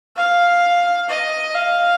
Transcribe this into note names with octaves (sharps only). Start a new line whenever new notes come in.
F5
D#5
F5